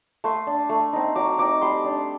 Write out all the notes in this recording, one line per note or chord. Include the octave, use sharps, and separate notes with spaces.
A3 C6
D4
A3
C4 D#4
F#3 D6
C4 D#4 D6
G3 C6
D4